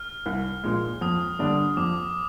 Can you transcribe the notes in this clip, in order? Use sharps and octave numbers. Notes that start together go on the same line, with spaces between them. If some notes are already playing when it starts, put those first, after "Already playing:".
Already playing: F6
C2
A#2 F3 G#3
F2 D#6
D3 G3 D4
F2 D6